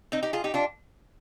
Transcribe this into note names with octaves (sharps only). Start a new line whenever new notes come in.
C4 D#4
D#4 G4
F4 G#4
D#4 G4
D4 F4